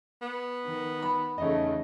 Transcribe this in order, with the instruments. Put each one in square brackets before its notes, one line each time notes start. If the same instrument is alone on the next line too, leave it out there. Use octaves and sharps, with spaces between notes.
[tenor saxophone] B3
[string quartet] D#3
[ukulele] B5
[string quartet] E2 C#3 A3 [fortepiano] C#4 D#4 D#5